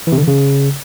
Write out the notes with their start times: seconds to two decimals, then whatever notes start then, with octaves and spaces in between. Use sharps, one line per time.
0.07 E3
0.12 C3
0.17 D3
0.22 E3
0.28 C#3